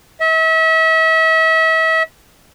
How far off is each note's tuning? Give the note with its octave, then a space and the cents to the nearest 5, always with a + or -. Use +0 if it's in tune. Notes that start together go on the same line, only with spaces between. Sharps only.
E5 -35